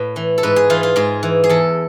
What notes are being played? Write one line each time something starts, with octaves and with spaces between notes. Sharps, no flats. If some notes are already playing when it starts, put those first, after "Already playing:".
Already playing: A2 B4
E3
A4
G#2 B4
G#4
E3 F4
F4
G#2 G#4
E3
G#4
E2 A4